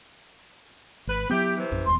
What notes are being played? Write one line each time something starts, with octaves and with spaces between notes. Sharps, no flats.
G#1 B4
F#3 B3 E4 G4
C3 E3
A#1 F#2
D#1 E2 C6